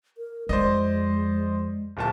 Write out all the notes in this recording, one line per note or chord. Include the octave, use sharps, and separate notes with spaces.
A#4
F2 G#3 C5 D5 D#5
D1 A#2 A5